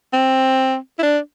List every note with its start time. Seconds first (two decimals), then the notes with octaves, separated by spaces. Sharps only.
0.13 C4
0.99 E4
1.03 D4